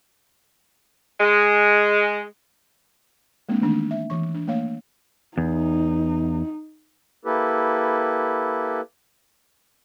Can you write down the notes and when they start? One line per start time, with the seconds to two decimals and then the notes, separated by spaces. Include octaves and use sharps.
1.20 G#3
3.49 G#3 A#3 C4 D4
3.61 D#3 E3 A3 A#3 D4 D#4
3.91 E5
4.10 E3 C#6
4.34 D4
4.47 A3 A#3 C#5 F5
5.38 E2 D#4
7.25 A#3 E4 G4 A4 B4